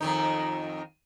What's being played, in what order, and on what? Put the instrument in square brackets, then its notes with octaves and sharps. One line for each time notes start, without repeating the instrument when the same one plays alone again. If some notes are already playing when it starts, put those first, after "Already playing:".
[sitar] F2 D#3 D#4